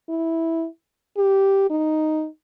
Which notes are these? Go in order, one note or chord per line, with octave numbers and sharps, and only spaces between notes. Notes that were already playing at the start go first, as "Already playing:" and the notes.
E4
G4
D#4